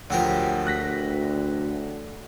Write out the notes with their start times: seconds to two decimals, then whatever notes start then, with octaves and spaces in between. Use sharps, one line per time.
0.10 D2 F3 F#3 G4 A#4
0.67 D2 F#6 A#6 B6